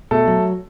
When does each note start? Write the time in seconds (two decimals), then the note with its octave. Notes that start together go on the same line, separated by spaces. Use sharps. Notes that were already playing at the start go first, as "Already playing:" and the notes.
0.11 B2 A3 A4
0.28 F#3